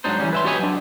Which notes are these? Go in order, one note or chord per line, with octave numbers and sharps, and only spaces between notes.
G#2 F#3 D4 D#4 C5
E3 F3 G3 C#4
B4 E5 C6
F#4 G4 B4 C#5 D#5 G#5
F#3 D4